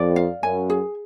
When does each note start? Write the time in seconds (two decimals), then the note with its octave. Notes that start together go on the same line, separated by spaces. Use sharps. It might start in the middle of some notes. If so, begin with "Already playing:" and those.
Already playing: F2 D5
0.16 F5
0.42 F#2 G#5
0.70 G#4